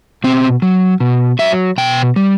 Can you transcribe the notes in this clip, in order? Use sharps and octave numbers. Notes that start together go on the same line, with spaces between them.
B2 C4
F#3
B2
F#3 E5
B2 G5
G3